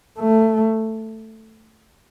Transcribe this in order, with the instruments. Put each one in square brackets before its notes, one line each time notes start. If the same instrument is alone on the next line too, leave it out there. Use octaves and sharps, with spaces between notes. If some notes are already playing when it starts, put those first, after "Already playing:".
[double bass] A3